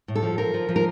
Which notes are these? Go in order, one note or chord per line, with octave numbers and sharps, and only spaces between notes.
A2
A4
F3
F3 A#4
F3
F3
A#4